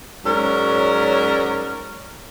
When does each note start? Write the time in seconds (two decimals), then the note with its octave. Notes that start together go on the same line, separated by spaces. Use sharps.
0.25 G#2 F#3 C#4 A#4 C#5 D5